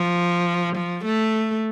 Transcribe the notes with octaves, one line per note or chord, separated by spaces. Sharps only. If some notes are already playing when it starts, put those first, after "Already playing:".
Already playing: F3
F3
A3